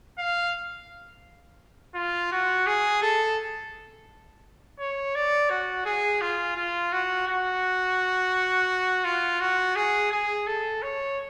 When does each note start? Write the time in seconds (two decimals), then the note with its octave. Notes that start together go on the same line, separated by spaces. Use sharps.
0.19 F5
1.95 F4
2.32 F#4
2.66 G#4
3.02 A4
4.79 C#5
5.15 D5
5.50 F#4
5.85 G#4
6.21 F4
6.56 F4
6.92 F#4
7.27 F#4
9.04 F4
9.40 F#4
9.76 G#4
10.12 G#4
10.47 A4
10.83 C#5